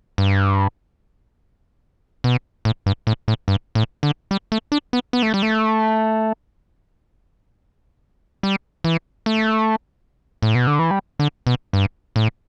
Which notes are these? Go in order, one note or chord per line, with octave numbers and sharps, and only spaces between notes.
G2
B2
A2
G2
A2
A2
G2
A2
D3
G3
A3
D4
B3
B3
A3
G3
A3
G3
E3
A3
A2
B2
D3
E3
G3
D3
B2
G2
A2